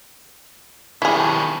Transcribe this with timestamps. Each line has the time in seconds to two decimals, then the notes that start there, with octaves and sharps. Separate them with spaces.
1.02 B2 D#3 G3 C4 D4 E4 G#4